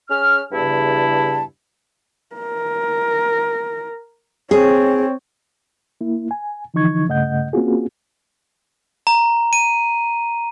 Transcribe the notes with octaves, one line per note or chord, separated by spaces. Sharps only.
C#4 G#4 F6
E2 G2 C#3 E4 A5
A#4
C4 G#4 C#5
A#3 E4
G#5
D3 E3 F3 D#4 C#6 G#6
G2 C#3 A3 D#5 F#5 G6
A#3 C4 C#4 F4 F#4 G#4
A#5
D#7